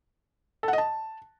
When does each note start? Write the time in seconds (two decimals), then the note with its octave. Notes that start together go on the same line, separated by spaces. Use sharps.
0.63 A4
0.68 F#5
0.73 D#5
0.78 A5